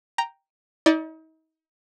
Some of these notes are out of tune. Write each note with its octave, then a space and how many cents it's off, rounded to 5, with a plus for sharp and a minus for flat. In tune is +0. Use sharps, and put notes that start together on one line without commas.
G5 +0 A#5 +0
D#4 +40 D5 +0